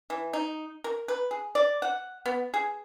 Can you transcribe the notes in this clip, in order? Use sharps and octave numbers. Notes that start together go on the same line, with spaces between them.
E3
D#4
A#4
B4
G#4
D5
F#5
B3
G#4